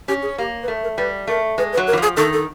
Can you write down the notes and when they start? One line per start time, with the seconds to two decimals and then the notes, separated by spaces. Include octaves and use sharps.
0.08 C#4 G4
0.23 G#4
0.38 A#3 G4
0.63 B4
0.68 A3 A#4
0.83 A#4
0.97 G3 B4
1.27 A3 A#4
1.58 G#3 B4
1.73 B4
1.77 F#3
1.87 A#4
1.93 E3
1.98 F3
2.03 G#4
2.17 D#3 A4
2.33 A4